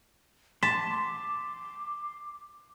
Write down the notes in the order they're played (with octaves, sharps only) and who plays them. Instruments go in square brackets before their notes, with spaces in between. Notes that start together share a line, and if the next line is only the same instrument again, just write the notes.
[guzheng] A5 [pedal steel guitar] C6 [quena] D6 [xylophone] B6